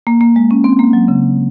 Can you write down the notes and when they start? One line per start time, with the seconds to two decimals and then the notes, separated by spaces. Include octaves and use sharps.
0.07 A#3
0.21 A#3
0.36 G#3
0.51 C#4
0.64 C4
0.79 A#3
0.93 F#3
1.08 C#3